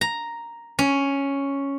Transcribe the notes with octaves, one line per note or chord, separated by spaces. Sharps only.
A#5
C#4